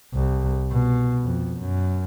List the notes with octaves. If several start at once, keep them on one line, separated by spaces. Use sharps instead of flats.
C2
B2
F2
F#2